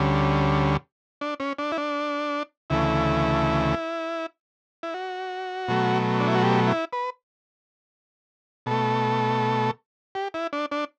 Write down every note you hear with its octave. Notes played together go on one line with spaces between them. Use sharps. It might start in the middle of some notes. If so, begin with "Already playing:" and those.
Already playing: D2 D3 G3 C#4
D4
C#4
D4
E4
D4
D2 C#3 E3 A3 E4
E4
F#4
B2 F#3 A3
D4
E4
F#4
G4
E4
B4
B2 A3 A4
G4
E4
D4
D4